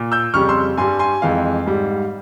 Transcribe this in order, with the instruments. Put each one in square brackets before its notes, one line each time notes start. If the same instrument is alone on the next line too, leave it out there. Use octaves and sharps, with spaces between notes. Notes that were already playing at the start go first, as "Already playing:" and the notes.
Already playing: [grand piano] A#2
E6 G6
F2 C#3 G3 C#6 F6
C6 E6
G2 G3 G#5 C6
G#5 C6
F2 E3 G#3 F5
G#2 G3